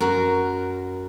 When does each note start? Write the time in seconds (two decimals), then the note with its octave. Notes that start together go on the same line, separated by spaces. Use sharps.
0.01 F#2 F#4 A#4